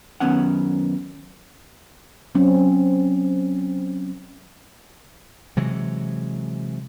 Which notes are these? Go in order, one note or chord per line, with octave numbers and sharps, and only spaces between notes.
F#2 D#3 B3 C#4 F#5
F#3 C4 C#4
C3 E3 F#3 G#3